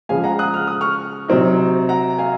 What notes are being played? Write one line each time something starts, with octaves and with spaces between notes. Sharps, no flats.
C#3 F3 G#3 F5 G#5
F#5 A#5
D#6 F#6
F6
D#6
C#6 F6
C3 F#3 C4 D#4
F#5 A#5
F5 G#5